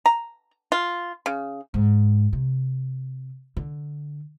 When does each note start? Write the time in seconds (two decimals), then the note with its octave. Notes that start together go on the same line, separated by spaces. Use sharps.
0.06 A#5
0.72 F4
1.26 C#3
1.74 G#2
2.33 C3
3.57 D3